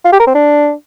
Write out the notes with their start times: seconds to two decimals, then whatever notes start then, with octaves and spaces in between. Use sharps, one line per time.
0.05 F4
0.12 G4
0.20 A#4
0.27 C4
0.35 D4